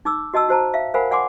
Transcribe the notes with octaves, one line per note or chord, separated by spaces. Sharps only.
D#4 D6 E6
F#4 D#5 A5 E6
F#4 C5 A5 A#5
E5 F5
A#4 C5 F5 F#5 G#5 B5
D5 F#5 G#5 C6 D6